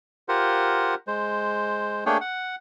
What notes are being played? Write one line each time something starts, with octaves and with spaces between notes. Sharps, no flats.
F4 G4 A#4 C5 F#5
G#3 C5
A3 A#3 D4 G#4 C#5 G5
F#5